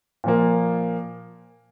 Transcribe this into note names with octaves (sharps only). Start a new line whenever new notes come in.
A#2 F3 A#3